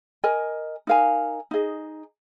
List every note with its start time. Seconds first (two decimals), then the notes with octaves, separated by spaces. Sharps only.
0.24 A#4 D#5 G#5
0.87 D#4 A#4 F5 G#5
1.51 D#4 G#4 D#5